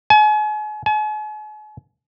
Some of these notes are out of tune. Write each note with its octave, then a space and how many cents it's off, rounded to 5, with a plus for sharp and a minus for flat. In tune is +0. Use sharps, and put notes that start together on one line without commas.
G#5 +40
G#5 +45